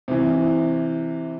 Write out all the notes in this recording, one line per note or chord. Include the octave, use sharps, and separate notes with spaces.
C3 E3